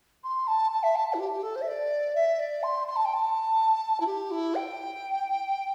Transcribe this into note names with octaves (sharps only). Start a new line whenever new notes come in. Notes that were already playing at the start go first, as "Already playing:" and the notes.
C6
A5
A5
E5
A5
A5
E4
G4
G4
A4
C5
E5
D5
E5
D5
C6
C6
A5
G5
A5
E4
G4
E4
G5